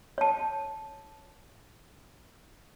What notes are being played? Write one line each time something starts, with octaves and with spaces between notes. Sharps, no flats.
C#5 A5